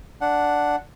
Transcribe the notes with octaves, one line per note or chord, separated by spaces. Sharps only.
D4 F#5